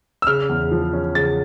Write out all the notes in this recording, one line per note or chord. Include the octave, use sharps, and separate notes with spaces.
E6
C#3 F6
E2
F3
C#4
C#3 A6